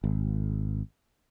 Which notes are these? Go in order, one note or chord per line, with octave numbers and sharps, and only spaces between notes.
G#1